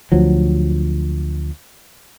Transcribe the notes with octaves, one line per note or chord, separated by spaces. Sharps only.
D2 F3 F#3